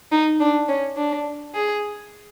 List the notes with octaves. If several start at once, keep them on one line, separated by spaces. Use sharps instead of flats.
D#4
D4
C#4
D4
G#4